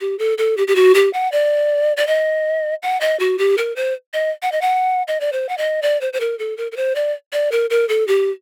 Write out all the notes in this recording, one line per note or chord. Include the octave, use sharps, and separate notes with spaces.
G4
A4
A4
G4
G4
F#4
G4
F#5
D5
D5
D#5
F#5
D#5
F#4
G4
A#4
C5
D#5
F#5
D#5
F#5
D#5
D5
C5
F#5
D#5
D5
C5
C5
A#4
A4
A#4
A#4
C5
D5
D5
A#4
A#4
A4
G4